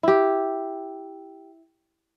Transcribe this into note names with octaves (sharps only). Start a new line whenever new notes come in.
E4 G4